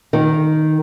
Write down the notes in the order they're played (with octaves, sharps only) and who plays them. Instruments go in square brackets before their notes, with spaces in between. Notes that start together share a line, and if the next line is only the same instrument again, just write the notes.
[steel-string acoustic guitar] D#3